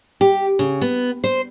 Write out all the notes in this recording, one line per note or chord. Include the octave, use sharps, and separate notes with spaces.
G4
C#3
B3
C5